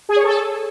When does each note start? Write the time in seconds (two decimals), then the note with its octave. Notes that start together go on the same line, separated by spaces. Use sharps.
0.09 G#4
0.16 C#5
0.24 A4